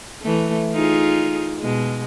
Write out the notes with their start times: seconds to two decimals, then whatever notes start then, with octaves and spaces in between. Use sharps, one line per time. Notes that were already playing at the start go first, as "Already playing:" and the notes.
0.22 E3 A3
0.73 D#4 F4 G#4
1.62 B2 G#3